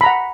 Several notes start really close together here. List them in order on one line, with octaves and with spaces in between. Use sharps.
B5 A#5 F#5